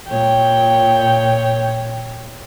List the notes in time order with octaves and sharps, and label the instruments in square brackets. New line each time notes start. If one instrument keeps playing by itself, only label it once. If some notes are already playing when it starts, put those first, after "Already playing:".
[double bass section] A#2 [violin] C#5 [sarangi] G5